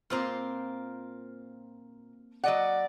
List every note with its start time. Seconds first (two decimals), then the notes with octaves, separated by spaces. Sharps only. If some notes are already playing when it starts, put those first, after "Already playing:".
0.10 A#2 A#3 C4 F4 C5
2.44 F#3 D5 D#5 F#5